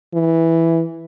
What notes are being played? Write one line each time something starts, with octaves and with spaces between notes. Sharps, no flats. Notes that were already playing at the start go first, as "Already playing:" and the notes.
E3